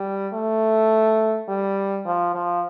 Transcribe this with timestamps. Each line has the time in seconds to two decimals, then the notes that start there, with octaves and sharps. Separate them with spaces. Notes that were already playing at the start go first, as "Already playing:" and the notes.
Already playing: G3
0.33 A3
1.48 G3
2.05 F3
2.35 F3